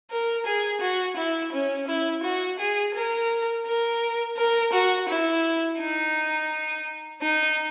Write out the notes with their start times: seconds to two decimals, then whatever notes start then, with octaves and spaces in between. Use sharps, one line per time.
0.11 A#4
0.46 G#4
0.81 F#4
1.17 E4
1.53 C#4
1.88 E4
2.24 F#4
2.60 G#4
2.95 A#4
3.67 A#4
4.37 A#4
4.73 F#4
5.09 E4
5.80 D#4
7.22 D#4